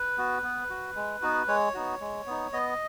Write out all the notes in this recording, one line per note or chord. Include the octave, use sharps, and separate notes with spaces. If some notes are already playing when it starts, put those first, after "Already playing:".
Already playing: B4
B3 F#4
B3
F#4
G#3
B3 D#4 F#4
G#3 C#5
B3 D#4 F#4
G#3
B3 D#4
B3 D#5